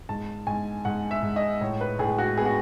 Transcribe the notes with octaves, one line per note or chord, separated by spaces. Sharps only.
G#2 A5
G#2 G#5
G#2 F#5
E5
G#2
D#5
A2 C#5
B4
A2 G#4
F#4
B3 G#4
F#4